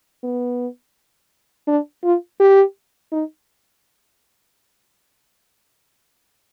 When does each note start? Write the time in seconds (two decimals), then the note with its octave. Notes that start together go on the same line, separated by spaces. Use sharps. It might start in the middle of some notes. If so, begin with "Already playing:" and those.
0.24 B3
1.68 D4
2.04 F4
2.40 G4
3.12 D#4